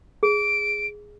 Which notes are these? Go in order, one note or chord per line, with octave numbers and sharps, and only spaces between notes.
G#4 D7